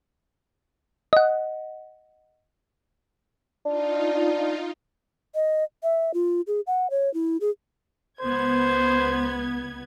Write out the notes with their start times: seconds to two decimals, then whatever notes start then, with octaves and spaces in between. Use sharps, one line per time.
1.13 D#5 F#5
3.65 D4 D#4 F4
5.35 D#5
5.83 E5
6.14 F4
6.47 G#4
6.67 F#5
6.90 C#5
7.14 E4
7.41 G#4
8.21 C#2 B3 C5 G#6